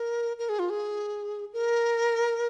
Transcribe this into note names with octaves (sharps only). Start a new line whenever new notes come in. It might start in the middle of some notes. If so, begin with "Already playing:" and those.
Already playing: A#4
A#4
G#4
F4
G#4
A#4